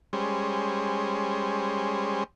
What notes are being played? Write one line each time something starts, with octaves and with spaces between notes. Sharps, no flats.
G3 G#3 C#4 C5